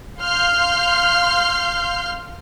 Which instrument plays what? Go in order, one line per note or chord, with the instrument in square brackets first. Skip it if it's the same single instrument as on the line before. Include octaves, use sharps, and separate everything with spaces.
[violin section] F5 C6 F6 G6 C7